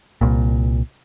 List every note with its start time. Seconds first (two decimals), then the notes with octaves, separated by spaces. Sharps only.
0.21 C2 A#2